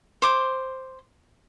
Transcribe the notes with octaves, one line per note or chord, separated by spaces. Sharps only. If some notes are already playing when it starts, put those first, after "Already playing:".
C5 C6 D6